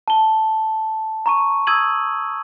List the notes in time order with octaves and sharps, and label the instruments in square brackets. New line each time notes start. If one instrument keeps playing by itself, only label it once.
[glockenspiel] A5 G7
A#5 C#6 D#7
D#6 E6 G#6 D#7 F#7